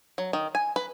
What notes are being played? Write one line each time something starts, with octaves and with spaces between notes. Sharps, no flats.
F#3
D#3
G#5
B4